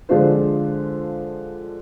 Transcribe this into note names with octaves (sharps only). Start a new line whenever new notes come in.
D3 F3 G#3 D4 F4 C5